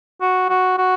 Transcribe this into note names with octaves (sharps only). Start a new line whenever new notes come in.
F#4
F#4
F#4